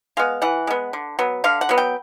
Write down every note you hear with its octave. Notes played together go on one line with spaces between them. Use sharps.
G#3 B3 F5
E3 F#5
G#3 B3
D3
F#3 B3
D3 F5
F#5
F#3 B3
G5